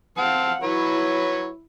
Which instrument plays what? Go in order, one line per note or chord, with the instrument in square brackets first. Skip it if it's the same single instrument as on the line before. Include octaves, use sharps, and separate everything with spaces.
[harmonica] C4 A5 [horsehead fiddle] F5 F#5
[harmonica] F#3 B4 C#5 [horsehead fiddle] E4